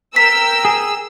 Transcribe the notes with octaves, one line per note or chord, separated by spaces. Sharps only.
A#4 G5 E6 B6
G#4